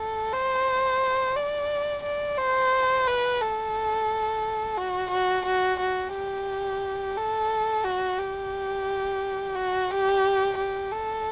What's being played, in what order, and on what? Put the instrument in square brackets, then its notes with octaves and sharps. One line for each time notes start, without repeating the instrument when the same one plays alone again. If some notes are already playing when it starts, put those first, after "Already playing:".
Already playing: [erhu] A4
C5
D5
D5
C5
B4
A4
F#4
F#4
F#4
F#4
G4
A4
F#4
G4
F#4
G4
G4
A4